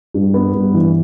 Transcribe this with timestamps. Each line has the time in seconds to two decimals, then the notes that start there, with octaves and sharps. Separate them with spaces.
0.14 G2
0.34 B3
0.54 G2
0.74 E3